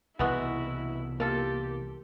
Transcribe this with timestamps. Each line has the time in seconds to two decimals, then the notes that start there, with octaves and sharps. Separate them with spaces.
0.19 C2 B2 E3 G#3 B3 E4 F#4 E5
1.20 A#3 F4 G4 A4